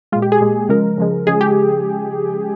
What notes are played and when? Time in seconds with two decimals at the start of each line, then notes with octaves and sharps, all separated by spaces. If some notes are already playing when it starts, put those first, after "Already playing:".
0.12 G#3 F4
0.16 A#2
0.22 G4
0.32 G#4
0.41 A#2 G#3
0.69 C#3 F3 G#3 A#4
0.98 C#3 F3 G#3
1.27 C#3 F3 G#3 G#4
1.41 G4